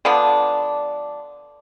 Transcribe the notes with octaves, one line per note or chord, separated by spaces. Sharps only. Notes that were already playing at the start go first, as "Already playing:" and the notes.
D3 F3 B3 D4